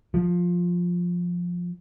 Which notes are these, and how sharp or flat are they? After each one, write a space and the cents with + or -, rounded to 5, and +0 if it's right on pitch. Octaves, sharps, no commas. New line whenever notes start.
F3 +10